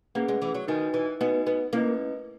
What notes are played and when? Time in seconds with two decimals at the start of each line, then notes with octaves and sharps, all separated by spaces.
0.15 A#3 C#4 G#4 B4 F#5
0.28 G#3
0.42 E3
0.55 F#3
0.68 D#3 D#4 F#4 B4 D#5 G#5
0.94 E3
1.20 B3 D#4 F#4 B4 D#5 G#5
1.47 B3
1.73 A#3 C#4 E4 B4 D#5